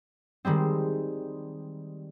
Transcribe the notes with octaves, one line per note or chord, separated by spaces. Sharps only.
D#3 G3 G#3 C4